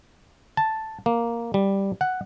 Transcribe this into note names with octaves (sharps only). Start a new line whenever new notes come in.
A5
A#3
G3
F#5